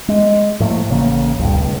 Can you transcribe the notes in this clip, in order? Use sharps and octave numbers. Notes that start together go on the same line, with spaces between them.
G#3
A2 F3 A3 A#3
A1 C#3 A#3
D1 B1 G2
C#2